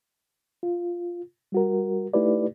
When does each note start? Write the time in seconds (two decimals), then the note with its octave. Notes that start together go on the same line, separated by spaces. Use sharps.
0.63 F4
1.52 G3 F#4 A#4
2.14 A3 D#4 E4 G4 B4 D5